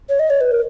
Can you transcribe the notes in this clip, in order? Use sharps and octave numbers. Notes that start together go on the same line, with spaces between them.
C#5
D#5
C#5
B4
A#4